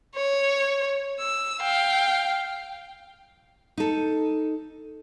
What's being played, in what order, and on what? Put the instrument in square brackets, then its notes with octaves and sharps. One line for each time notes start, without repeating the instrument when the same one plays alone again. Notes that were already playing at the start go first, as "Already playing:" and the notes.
[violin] C#5
E6
F5 G5
[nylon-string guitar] D#4 A4